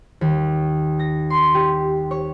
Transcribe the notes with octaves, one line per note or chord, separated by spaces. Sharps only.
D#2
A#6
C6
G4
C#5